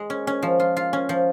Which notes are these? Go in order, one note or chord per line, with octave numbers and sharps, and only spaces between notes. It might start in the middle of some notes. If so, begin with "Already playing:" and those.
Already playing: G#3
C#4
C#4
F3
F4
F4
C#4
F3